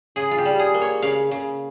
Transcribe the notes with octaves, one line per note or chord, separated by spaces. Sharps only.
C#3 G#4
F4
G4
G3
G#4
A#3
C#5
C#3 F5
C#3